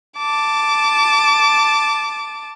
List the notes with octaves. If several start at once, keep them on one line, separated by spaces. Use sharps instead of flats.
A5 D6